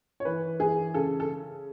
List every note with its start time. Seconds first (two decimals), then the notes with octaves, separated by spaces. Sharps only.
0.20 C#5
0.25 E3 B4
0.60 E3 G#4
0.94 C#3 A4
1.20 A4